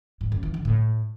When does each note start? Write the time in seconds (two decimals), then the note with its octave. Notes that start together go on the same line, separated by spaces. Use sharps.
0.21 G#2
0.32 F#2
0.43 E3
0.54 D3
0.65 A2